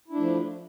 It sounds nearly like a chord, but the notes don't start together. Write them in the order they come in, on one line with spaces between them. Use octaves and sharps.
E4 D4 A3 F3